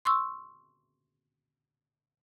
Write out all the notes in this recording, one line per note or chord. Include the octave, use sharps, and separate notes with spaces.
C6 C#6 E6